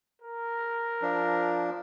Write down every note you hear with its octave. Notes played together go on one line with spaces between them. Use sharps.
A#4
F3 D4